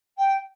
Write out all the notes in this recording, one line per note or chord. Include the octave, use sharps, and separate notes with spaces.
G5